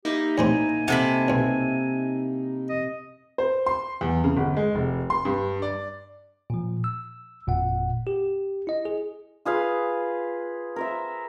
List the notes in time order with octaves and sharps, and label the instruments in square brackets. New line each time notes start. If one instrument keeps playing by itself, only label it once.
[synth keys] A#3 D#4 E4 [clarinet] G4
[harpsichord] A2 G3 C4 [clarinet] G#5
[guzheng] C3 A4 B5 [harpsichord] F#5
[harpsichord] B1 G2
[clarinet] D#5
[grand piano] C5
C6
E2
C#3
G1
G#3
F1
C6
G2
D5
[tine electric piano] A#2 F3
E6
G1 F2 A#2 F#5
G4
E4 D#5
G#4
[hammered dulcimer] F4 G#4 B4 F5
A#4 C5 E5